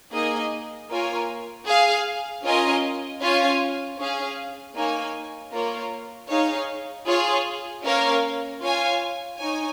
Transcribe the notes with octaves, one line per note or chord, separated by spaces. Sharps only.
A#3 D#4 G#4 D#5 G#5
A#3 F4 A#4 C#5 G#5
G#4 F5 G#5
C#4 F4 A#4 D#5 G#5
C#4 F4 C#5 F5 G#5
C#4 G#4 F5
A#3 D#4 C#5 G#5
A#3 F4 A#4 C#5
D#4 G#4 C#5 F5
F4 G#4 C#5 F5 G#5
A#3 C#4 A#4 C#5 F5
F4 C#5 F5 G#5
D#4 C#5 G#5